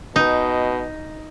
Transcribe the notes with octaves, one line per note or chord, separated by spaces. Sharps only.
B2 D#4